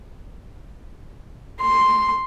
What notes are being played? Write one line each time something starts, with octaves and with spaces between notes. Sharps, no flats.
C6